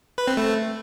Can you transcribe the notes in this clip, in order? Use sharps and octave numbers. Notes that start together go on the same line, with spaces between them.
B4
C4
A3